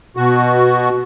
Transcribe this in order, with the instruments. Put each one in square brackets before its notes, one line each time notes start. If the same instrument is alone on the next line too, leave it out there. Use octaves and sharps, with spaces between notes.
[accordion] B2 F#4